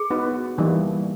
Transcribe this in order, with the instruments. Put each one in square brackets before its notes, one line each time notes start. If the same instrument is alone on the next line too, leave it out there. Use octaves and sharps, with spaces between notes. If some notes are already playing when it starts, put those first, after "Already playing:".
Already playing: [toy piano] G#4
[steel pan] B3 D#4 F#4 B4
E3 G3 A#3 D#4